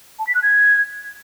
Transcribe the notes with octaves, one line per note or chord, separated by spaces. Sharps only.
A5
B6
F#6
G#6